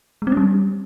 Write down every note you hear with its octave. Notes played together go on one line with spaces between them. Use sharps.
G#3
C4
C#4
G3